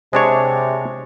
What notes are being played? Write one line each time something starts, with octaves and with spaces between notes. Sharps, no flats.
C3 G#3 D4 C#5